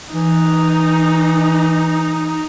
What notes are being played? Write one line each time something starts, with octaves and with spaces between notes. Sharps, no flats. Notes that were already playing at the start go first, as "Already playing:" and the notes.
E3 D#4